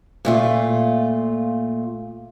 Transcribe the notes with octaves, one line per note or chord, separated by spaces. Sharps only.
A#2 A3 F4